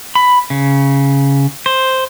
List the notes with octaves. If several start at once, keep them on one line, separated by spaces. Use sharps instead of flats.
B5
C#3
C5